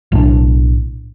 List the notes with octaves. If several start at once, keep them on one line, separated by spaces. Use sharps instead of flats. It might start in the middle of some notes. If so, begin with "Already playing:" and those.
B1 A2 D#3 D4